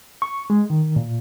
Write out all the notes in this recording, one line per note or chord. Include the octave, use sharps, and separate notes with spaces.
C#6
G#3
D#3
A#2